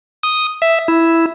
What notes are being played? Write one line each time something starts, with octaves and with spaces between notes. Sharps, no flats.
D#6
E5
E4